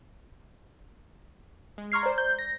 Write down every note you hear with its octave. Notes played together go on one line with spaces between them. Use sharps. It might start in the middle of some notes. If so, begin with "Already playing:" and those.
G#3
A#5 C6 C#6 F6 G#6 C7
C5 D5
G6
A#6